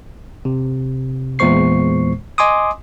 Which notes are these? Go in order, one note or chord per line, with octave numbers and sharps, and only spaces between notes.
C3
E2 A#2 G#3 C5 C#6 C7
D#5 G#5 C6 D6 D#6